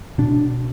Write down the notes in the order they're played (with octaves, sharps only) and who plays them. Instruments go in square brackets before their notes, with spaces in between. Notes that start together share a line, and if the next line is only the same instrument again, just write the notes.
[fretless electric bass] B2 D4